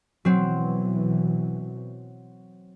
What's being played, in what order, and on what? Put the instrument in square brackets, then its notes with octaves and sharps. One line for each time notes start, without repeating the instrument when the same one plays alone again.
[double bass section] B2 E3 [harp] F#3 C4